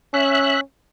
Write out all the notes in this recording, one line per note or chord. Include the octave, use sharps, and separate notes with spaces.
C#4 E5 F#6